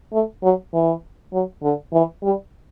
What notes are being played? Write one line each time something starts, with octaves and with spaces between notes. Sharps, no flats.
A3
F#3
E3
F#3
D3
E3
G3